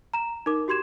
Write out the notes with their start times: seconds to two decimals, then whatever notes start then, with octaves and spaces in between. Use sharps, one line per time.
0.14 A#5 E7
0.46 D#4 A#4 D6
0.68 F#4 G4 C6 G#6 E7